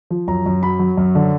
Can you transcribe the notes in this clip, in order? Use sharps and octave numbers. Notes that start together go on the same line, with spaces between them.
F3
F#2 A#5
F#2
F#3 B5
F#3
F#2
D3